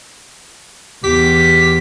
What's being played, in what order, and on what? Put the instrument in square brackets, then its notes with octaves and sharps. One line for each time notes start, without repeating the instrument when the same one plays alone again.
[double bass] E2 [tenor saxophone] G4 [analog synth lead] B6